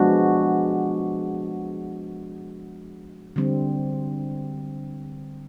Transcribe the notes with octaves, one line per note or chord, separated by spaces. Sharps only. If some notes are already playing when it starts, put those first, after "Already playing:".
Already playing: F3 G#3 B3 D4 F#4
D3 G3 C4